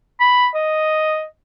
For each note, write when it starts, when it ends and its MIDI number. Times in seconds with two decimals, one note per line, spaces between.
0.20 0.47 83
0.55 1.26 75